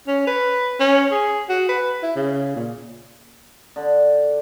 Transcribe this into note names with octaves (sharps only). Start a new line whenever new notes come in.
C#4
B4
C#4
G#4
F#4
B4
E4
C#3
A#2
D3